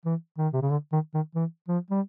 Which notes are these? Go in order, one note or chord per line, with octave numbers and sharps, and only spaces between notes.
E3
D#3
C3
C#3
D3
D#3
D#3
E3
F3
G3